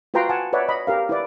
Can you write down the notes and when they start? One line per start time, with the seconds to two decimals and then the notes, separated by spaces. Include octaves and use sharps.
0.14 F4 F#4 B4 G5 A#5 C6
0.29 F#5 G#5 A5
0.53 B4 C#5 D5 E5 F#5
0.69 D#5 B5
0.87 G4 A#4 F5
1.09 E4 B4 D5